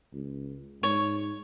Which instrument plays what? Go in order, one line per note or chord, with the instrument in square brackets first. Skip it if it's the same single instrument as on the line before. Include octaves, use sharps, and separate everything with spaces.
[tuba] C#2
[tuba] G#2 [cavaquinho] C#5